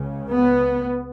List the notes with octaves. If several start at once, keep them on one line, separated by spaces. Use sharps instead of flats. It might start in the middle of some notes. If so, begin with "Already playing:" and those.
Already playing: C#2 C#3
B3